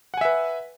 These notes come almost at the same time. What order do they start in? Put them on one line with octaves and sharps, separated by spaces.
F#5 G#5 E5 B4